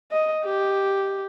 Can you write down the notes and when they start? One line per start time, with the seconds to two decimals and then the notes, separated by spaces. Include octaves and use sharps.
0.12 D#5
0.45 G4